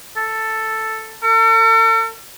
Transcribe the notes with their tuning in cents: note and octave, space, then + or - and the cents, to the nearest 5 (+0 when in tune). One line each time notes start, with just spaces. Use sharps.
A4 +5
A4 +45